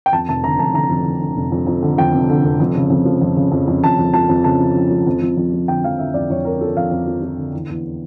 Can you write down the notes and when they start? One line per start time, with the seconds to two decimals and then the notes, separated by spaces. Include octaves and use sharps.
0.06 G5
0.12 F2 A5
0.29 F1 A5
0.44 D3 A#5
0.59 F1 A5
0.74 D3 A#5
0.90 F2
1.06 D3
1.21 D3
1.37 F1
1.52 F2
1.67 F2
1.82 D3
1.98 F2 G5
2.14 F1
2.29 D3
2.45 F1
2.60 F2
2.75 C#3
2.90 F2
3.05 F3
3.21 F2
3.36 C#3
3.52 F2
3.68 F2
3.84 F2 A5
3.98 F2
4.14 F3 A5
4.29 F2
4.44 C#3 A5
4.60 F3
4.76 F3
4.91 F3
5.07 F2
5.21 F2
5.37 F2
5.53 F3
5.68 D3 G5
5.84 F3 F5
5.99 D3 E5
6.14 F2 D5
6.30 F2 C#5
6.45 F2 A#4
6.61 F3 A4
6.76 F2 F5
6.91 F2
7.07 F3
7.22 F3
7.38 D3
7.53 E2
7.69 E2